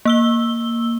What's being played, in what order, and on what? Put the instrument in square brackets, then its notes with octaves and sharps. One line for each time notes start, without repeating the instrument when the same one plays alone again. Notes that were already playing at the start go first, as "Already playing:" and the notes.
[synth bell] A#3 E6 G7